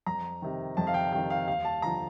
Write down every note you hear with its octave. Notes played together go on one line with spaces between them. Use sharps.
F2 A#5
C3 D#3
F2 A5
F5
G5
C3 D#3 G5
F5
D#2 F5
A5
D3 F3 A#5